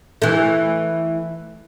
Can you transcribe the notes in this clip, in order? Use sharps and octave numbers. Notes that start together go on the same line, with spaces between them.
E3 A3